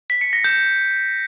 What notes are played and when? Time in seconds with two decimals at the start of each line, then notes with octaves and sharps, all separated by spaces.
0.10 B6
0.21 C#7
0.33 A#6
0.44 G6